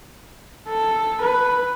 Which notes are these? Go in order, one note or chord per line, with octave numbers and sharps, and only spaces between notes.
A4
B4